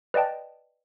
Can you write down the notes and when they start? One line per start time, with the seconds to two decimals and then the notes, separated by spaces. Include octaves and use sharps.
0.14 B4 D5 D#5 G5 A5